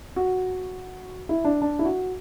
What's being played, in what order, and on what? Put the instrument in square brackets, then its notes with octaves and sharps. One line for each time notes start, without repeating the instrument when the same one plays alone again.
[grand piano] F#4
E4
D4
D4
E4
F#4